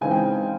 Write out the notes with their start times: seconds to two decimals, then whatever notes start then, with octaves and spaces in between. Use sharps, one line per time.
0.01 C#3 E3 G#3 C4 D#4 G#5
0.11 G5